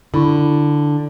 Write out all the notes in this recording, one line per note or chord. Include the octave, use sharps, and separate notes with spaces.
D3 E4 B5 C#6